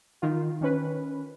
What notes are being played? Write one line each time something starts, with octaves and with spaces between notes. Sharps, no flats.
D#3 F4
D#3 C#4 B4